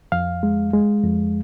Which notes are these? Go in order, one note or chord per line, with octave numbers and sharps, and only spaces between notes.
F2 F5
G#3
G#3
F2